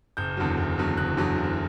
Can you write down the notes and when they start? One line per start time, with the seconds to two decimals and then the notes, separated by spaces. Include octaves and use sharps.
0.17 F#1 G6
0.37 E2 D3 F#3
0.58 F#1
0.78 E2 D3 F#3
0.97 F#1 F#6
1.17 E2 D3 F#3
1.38 F#1